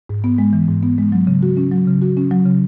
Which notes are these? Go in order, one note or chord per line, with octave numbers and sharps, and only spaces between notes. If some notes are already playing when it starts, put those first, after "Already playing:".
G#2
B3
G#3
E3
G#2
B3
G#3
F#3
C#3
F#4
C#4
F#3
C#3
F#4
C#4
F#3
C#3